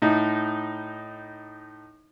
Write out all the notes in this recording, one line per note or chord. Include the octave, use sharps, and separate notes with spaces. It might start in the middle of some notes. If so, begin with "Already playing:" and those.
A2 D#4